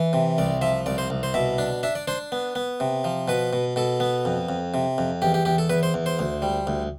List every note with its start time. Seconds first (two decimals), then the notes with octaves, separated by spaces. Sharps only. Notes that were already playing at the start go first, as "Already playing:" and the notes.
Already playing: E3
0.13 C3
0.38 C2 D5
0.62 F3 E5
0.86 C2 D5
0.98 C5
1.10 C2
1.23 C5
1.34 B2 E5
1.58 D4
1.83 D4 E5
1.95 D5
2.08 D4 C5
2.32 B3
2.55 B3
2.80 C3
3.04 F3
3.28 B2 B4
3.53 B2
3.76 B2 A4
4.00 B3
4.25 F2
4.49 F2
4.74 C3
4.98 F2
5.22 E2 G4
5.34 G4
5.45 E2 G4
5.58 A4
5.70 E2 B4
5.83 C5
5.94 E2
6.06 C5
6.19 D2
6.42 G3
6.67 D2